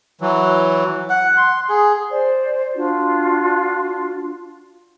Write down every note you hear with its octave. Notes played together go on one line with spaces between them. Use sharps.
E3 F#3
F#5
C6
G#4
C5 D5
D4 F4 F#4